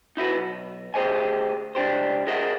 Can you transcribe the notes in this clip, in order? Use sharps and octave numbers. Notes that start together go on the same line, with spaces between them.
D#4 E4 F#4 B4
B1
D2 G4 G#4 C5 D#5 G#5
C#2 D4 G4 C5
G#4 A#4 D#5 E5 F#5